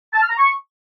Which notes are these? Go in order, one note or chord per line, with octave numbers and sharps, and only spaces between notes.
A5
F6
A#5
C#6